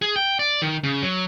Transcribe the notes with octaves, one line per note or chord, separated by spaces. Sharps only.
G#4
G5
D5
D#3
C#3
F#3